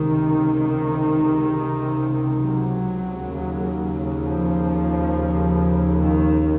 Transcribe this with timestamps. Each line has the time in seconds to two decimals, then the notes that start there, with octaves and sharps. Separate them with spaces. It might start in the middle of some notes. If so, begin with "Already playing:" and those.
Already playing: C#2 C3 D#3
2.36 F#3
3.27 D#2 C#3
4.18 F3
5.99 D#3